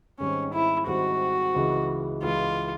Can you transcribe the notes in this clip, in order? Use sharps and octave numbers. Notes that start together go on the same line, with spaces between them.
G#2 D#3 G3 C4 C#4
E4
G#2 D#3 G3 C4 F#4
C#2 C#3 E3 G#3
C#2 C#3 E3 G#3 F4